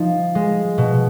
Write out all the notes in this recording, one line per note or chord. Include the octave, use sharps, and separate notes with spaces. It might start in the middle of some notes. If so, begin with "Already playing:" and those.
Already playing: F3 D#4
G#3
B2